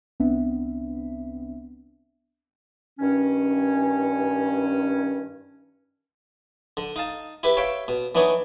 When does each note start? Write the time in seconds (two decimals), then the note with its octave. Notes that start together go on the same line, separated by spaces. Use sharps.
0.20 C2 B3 C4 D4 E5
2.99 G2 D#3 C#4
6.77 D3
6.96 D#4 F5 A5
7.43 E4 G4 B4
7.57 C#5 E5 F5 G5
7.88 B2
8.15 E3 B3 D4 D#4 C#5